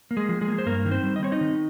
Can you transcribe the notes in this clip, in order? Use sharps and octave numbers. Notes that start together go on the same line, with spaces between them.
A#3
G#3 G#4
F3
G#3 G#4
A#3
C5
G2 A#3 A#4
D#3
C4 C5
G3
D#5
C4 C#5
D#4 D#5
D#3